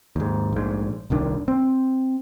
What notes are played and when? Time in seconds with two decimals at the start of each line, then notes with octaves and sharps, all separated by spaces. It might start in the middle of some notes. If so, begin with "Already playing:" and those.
0.16 D#2 G#2
0.53 A#1 G#2
1.10 D#1 C2 D#3 D4
1.48 C4